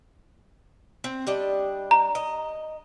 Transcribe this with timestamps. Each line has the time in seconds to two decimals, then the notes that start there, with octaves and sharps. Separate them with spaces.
1.04 C4
1.27 G3 D4 D#5
1.91 A#5
2.15 D#5